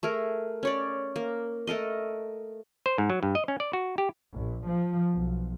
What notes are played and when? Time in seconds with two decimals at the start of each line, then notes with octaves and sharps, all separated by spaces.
0.03 A3 G#4 A#4
0.63 C#4 C#5 D5
1.16 A#3
1.67 A3 A4 A#4 D#5
2.86 C5
2.98 G#2
3.10 F#3
3.23 G2
3.35 D#5
3.48 C#4
3.60 D5
3.73 F#4
3.98 G4
4.34 A#1
4.67 F3
5.14 B1